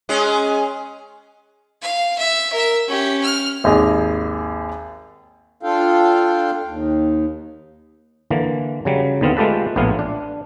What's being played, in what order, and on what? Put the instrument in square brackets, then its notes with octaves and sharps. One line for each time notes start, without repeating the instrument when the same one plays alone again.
[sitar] G#3 C#4 G#4
[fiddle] F5
E5
A#4 E5
C#4 G4
F6
[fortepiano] G#1 D#2 G#4 D#5
[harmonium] D4 F4 A4 F5 G5
D#2
[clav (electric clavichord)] D3 E3 A#3
C#3 F#3 G3
D#2 D3 B3 C4 F5
G#3 A3 F4 G4 A4 B4
A#1 A2 B3 E4 F4 F5
D4